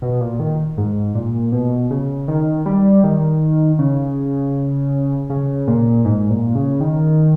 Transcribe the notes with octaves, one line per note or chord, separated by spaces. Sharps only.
B2
A#2
D#3
G#2
A#2
B2
C#3
D#3
G3
D#3
C#3
C#3
A#2
G#2
A#2
C#3
D#3